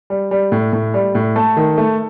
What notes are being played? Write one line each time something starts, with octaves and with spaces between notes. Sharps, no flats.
G3
G3
A2
A2
G3
A2
A3 A4
D#3
A3